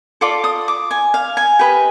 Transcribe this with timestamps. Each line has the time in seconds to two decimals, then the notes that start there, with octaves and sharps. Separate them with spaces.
0.21 F4 A4 D5 D6
0.44 D#6
0.68 D6
0.91 G#5
1.14 F5
1.37 G#5
1.59 G4 B4 D#5